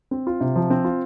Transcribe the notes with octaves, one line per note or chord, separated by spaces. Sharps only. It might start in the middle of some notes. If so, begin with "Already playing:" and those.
C4
F4
C3
F3
C4
F4